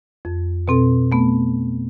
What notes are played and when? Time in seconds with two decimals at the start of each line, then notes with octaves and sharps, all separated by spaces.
0.25 F2
0.68 B2 C4 A4
1.12 A3 B3